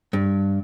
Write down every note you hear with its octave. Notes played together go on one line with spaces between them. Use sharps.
G2